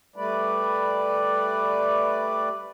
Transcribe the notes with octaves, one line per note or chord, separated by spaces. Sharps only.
G3 A3 B4 D5